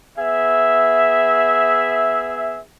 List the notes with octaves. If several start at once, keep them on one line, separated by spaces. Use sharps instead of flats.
B3 G#4 E5